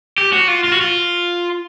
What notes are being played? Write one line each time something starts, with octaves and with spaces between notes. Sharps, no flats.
G4
F#4
F4
F4
F#4
F4